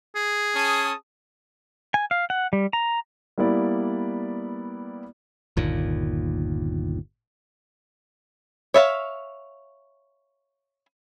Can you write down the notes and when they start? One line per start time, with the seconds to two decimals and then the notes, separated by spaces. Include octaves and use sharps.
0.16 G#4
0.55 C#4 A5 D#6
1.94 G#5
2.11 F5
2.30 F#5
2.53 G3
2.73 A#5
3.38 G3 A#3 B3 E4 D5
5.57 G1 D#2 A#2
8.74 C#5 E5 F5